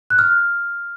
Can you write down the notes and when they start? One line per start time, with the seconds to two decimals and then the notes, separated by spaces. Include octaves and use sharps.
0.10 F#6
0.19 F6